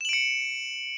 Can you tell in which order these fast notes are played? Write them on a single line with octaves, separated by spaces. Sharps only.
E7 F#7 D7 C#7